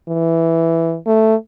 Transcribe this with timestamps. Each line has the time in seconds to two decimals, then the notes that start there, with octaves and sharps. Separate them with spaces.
0.08 E3
1.06 A3